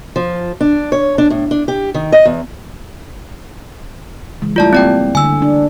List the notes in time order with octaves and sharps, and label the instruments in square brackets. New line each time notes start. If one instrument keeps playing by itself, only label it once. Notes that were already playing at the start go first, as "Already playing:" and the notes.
[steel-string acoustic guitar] F3
D4
C#5
D4
A2
D4
G4
D#3
D#5
E2
[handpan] C#3 E3 G#3
[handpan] G3 A3 E4 [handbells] F4 D5 A5
[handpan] A#3 [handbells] C4 D5 G5
[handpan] D3 [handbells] G#5 E6
[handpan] D4